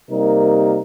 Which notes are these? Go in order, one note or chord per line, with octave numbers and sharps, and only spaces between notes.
C3 G3 A#3 D#4 A#4